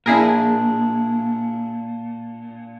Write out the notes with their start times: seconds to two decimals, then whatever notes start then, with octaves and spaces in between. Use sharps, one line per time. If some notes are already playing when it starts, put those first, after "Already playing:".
0.06 A#2 D4 E4 G#4 A#4